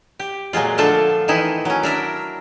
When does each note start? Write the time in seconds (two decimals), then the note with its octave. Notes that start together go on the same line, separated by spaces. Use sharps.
0.20 G4
0.53 A#2 F#3 G#3 F4
0.78 D3 F3 A3 D4 F4 A4
1.28 D#3 E3 D#4 E4
1.65 F#3 C#4
1.83 D4 A#4 E5